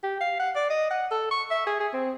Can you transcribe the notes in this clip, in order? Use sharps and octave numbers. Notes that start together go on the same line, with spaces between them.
G4
F5
F#5
D5
D#5
F#5
A4
C#6
E5
G#4
G#4
C4